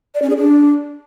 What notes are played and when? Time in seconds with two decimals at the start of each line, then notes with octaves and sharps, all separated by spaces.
0.14 D5
0.22 C#4
0.30 G#4
0.37 D4